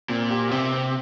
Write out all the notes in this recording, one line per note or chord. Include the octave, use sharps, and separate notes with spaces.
A#2 C4
G4
C3 C4
C4